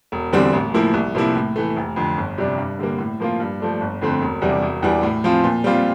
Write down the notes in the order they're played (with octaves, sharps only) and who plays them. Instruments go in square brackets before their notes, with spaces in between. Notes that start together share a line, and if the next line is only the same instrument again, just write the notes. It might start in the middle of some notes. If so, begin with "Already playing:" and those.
[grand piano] E1
E2 D3 G3 C4
A1
A2 F3 A#3 E4
C2
C3 F3 A#3 E4
A2
E3 A3
F1
F2 D3
G1
F2 C3 G3 D4
G2
D3 G3 A#3
A2
F3 A#3 F4
G2
F3 A3 D4
G1
F2 D3 A3 C4
E1
E2 C3 G3 D4
E1
E2 E3 G3 D4
A2
F3 C4 F4
A#2
G3 C4 F4